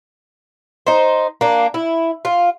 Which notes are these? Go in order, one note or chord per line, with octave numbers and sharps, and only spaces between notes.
D#4 C5
A#3 D4
E4
F4